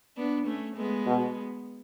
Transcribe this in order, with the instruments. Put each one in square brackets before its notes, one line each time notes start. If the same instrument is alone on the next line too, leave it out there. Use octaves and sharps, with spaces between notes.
[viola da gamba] B3 D4
A3 C#4
G#3 B3
[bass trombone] B2